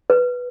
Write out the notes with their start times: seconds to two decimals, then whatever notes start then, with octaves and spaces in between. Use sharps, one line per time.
0.10 B4